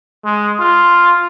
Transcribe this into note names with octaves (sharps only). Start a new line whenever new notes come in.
G#3
F4